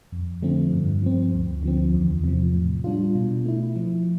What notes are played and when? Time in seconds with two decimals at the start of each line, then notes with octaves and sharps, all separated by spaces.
0.12 F2
0.43 D3 F3 A3 C4
0.72 G2
1.03 F3 C4
1.33 D2
1.63 D3 F3 C4
1.94 E2
2.24 C3 F3
2.54 A2
2.84 G3 D4 F4
3.15 B2
3.45 A3 E4
3.76 F3